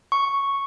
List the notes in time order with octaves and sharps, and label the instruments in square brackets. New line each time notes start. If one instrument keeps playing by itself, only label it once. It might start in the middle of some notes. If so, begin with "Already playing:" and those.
[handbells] C#6